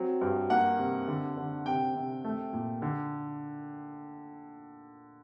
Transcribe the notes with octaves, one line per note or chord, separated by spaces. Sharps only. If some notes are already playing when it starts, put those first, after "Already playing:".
Already playing: F#3 C4
G2
A#3 F#5
C3
D3
D3
C3 G5
C3
A3
A#2
D3